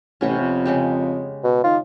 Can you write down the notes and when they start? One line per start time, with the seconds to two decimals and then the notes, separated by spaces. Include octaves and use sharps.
0.21 A1 C3 B3 C#4
0.40 F2
0.66 C#3 G#3 G4
1.44 B2
1.64 D#3 F4